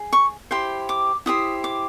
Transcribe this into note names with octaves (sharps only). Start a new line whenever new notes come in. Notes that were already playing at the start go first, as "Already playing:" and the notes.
Already playing: G#4
C#6
E4 G4 C5 C6
D6
E4 G4 C5 D#6
D6